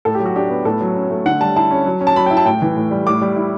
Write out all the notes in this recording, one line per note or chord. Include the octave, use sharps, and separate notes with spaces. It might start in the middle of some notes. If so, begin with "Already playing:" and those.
A2 A4
G4
F#3
F#4
D4 G4
B3
A2 A4
F#3
C#4
A3
D3 F#5
G3 A5
E4 A5
C#4
F#3
C#4
A5
F#3 B5
G5
E4
A5
A2 G5
E3
A2
G3
A2 D6
G3
E4